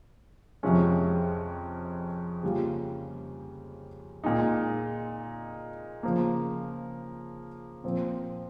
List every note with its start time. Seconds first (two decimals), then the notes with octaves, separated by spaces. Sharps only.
0.63 F2 C3 F3 G#3 C#4
2.43 C#3 G3 A#3 C#4 F4
4.24 A#2 G#3 D#4
6.03 C#3 F3 A#3
7.84 A#2 F3 C4